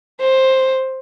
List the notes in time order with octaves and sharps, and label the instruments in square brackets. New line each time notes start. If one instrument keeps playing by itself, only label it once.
[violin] C5